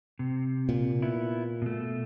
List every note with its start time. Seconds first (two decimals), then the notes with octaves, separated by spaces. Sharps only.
0.19 C3
0.69 A#2
1.02 B3 E4
1.62 B2 A3